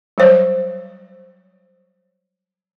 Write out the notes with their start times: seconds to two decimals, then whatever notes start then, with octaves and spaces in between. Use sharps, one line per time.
0.18 F#3 G3 C5 C#5